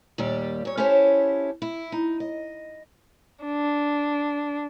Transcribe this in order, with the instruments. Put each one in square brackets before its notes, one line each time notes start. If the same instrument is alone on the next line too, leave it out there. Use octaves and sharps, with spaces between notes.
[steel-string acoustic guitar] D#2 A#2 G3 G4 D5 G5
A#2 C#5
C#4 E4 G4 A4 C5 C#5
E4
D#4
D#5
[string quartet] D4